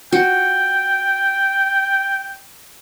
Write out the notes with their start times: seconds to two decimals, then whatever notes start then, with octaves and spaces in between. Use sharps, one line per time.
0.12 F#4 G5